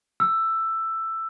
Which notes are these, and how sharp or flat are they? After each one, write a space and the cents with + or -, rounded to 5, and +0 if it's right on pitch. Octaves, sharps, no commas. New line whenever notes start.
E6 +10